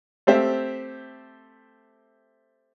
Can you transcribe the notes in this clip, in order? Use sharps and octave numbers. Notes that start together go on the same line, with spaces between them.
A3 C4 G4 C5 E5 F5